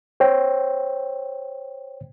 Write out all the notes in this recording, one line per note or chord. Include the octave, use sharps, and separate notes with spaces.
C5 C#5 G5